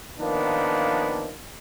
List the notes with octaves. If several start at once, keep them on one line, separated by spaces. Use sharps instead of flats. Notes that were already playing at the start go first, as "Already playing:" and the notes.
D#3 F3 A#3 B3 D4